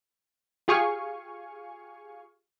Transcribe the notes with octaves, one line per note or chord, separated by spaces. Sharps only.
F4 G4 G#4 F5 G#5 C#6